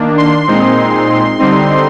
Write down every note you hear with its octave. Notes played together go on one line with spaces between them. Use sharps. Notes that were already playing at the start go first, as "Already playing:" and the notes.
Already playing: D#3 A#3 D4
C6
A#2 G#3 C4 D#4
D3 G3 C4 D#4